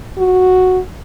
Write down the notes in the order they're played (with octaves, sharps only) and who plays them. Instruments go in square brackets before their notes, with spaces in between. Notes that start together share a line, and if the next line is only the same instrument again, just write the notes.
[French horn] F#4